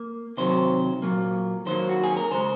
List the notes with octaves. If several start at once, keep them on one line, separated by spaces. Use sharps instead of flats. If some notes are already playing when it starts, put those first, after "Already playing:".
Already playing: A#3
C3 D#3 F#3 C5
A#2 F#3 A#3
D#3 F#3 A#3 C5
F#4
G#4
A#4
C#3 G#3 C5